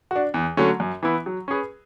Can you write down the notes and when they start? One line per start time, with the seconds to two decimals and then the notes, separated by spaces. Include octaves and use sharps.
0.11 D4 F#4
0.34 E2
0.57 D3 F#3 A3 C#4
0.80 F#2
1.03 E3 B3 E4
1.26 F#3
1.48 C#4 G#4 B4